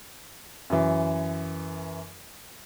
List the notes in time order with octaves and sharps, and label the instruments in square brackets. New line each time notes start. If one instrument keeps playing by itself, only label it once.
[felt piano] F#2 E3